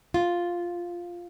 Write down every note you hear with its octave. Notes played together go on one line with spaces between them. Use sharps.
F4